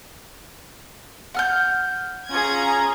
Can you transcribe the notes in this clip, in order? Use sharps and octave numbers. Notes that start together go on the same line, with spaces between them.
F#5 F6 G6
C#4 F4 G#4 A#5 G#6